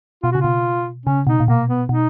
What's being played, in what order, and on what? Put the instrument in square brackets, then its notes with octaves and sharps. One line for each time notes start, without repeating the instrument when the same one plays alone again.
[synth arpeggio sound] B2 [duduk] F4
[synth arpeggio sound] C#3 [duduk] F#4
[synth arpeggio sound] B2 [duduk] F4
[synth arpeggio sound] C#3 [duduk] C#4
[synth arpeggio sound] B2 [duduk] D#4
[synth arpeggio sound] A#2
[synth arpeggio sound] B2 [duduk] A#3
[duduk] B3
[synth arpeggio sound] B2 [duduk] D#4